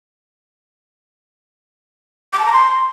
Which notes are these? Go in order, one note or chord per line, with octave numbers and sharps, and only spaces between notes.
D6
A5
A#5
C6